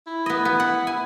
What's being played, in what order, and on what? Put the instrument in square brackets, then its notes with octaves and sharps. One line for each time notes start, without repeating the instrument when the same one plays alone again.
[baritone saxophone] E4
[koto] B3 D#5
B3
F#5
G#5